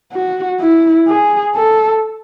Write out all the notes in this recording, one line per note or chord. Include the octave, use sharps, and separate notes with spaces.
F#4
E4
G#4
A4